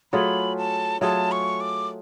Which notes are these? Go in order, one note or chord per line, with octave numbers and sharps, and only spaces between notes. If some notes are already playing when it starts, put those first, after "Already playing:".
F#3 A3 F4 G#4 B5
A5
F#3 A3 F4 G#4 A5
C#6
D6